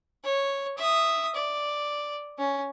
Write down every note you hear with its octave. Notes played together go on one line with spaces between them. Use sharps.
C#5
E5 D#6
D5
C#4